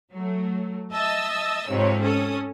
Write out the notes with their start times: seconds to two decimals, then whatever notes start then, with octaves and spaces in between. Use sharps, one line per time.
0.13 F#3 A3
0.93 D#5 E5 A5 D#6 E6
1.69 F2 G#2 C3 C#5
2.02 C#4 A4 D#6